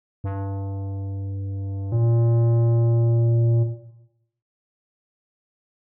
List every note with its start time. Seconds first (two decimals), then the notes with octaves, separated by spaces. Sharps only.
0.24 G2
1.92 A#2